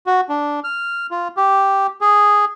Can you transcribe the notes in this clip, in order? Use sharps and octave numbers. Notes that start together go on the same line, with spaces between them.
F#4
D4
F6
F4
G4
G#4